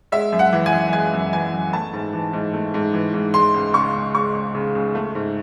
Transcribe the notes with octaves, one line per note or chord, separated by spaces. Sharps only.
G#3 E5
F#2
F#5
E3
G#5
F#2
G#3 G#5
F#2
E3 G#5
F#2
A3 A5
G#2
E3
G#2
A3
G#2
E3
G#2
G#3 C6
C#2
C#3 C#6
C#2
G#3 C#6
C#2
C#3
C#2
A3
G#2